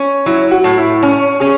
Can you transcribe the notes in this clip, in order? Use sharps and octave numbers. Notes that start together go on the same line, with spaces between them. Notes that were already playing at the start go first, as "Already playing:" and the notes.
Already playing: C#4
F#3 E4
F#4
A2
E4
C#4
C#4 G#4